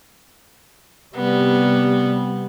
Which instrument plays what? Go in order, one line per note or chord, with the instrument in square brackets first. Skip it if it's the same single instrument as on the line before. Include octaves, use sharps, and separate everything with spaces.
[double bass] C3 G3 [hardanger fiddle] B3